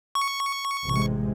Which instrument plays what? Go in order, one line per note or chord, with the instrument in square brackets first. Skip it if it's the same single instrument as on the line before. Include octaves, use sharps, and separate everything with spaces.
[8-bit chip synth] C#6
[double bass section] A1 C3 G#3